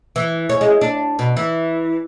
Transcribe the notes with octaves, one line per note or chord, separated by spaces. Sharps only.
E3
C#4
G#3
D4
B2
E3